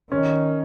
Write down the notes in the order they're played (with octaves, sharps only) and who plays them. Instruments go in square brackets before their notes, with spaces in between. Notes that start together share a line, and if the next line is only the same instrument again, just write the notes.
[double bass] D#3 [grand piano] C#4